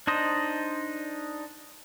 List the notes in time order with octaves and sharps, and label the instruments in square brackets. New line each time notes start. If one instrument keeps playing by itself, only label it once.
[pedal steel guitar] D4 D#4 C5 D#5